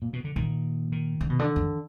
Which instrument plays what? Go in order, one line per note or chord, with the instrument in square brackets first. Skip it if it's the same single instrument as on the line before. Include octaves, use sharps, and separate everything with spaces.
[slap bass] A#2
B2
D3
[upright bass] A#2 [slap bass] D#3
[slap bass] D#3
[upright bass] D3
B2
D3
F2